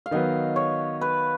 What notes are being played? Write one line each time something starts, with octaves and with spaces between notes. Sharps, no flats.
F5
D#3 F#3 B3 D#5
C#5
B4